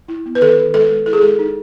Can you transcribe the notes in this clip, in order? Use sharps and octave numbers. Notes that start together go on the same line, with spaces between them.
E4
B3
B4
D#3 A4
D#3
G#3 A4
G#3
E4 A4
G#4
G#3 A4
D#4